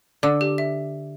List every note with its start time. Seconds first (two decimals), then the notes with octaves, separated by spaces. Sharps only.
0.23 D3 E6
0.41 G4
0.58 E5